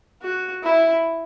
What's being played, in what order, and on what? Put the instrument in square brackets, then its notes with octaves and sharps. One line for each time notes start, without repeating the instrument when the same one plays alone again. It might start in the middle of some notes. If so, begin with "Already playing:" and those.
[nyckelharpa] F#4
E4